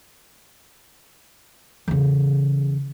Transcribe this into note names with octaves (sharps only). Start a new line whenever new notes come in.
E2 C#3